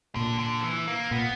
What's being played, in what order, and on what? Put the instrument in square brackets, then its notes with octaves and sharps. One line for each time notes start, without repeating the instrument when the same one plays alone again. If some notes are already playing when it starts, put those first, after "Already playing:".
[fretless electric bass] A#2 [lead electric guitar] D3
[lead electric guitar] D3
F3
E3
A#3
[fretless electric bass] A#2 [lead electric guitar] B3